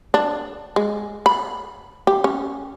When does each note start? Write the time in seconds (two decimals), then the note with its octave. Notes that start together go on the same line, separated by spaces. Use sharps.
0.14 D4
0.76 G#3
1.26 B5
2.07 G4
2.24 C#4